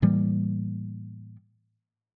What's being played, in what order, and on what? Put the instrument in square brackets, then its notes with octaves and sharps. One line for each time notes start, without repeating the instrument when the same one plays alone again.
[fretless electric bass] A2 E3 G3 A#3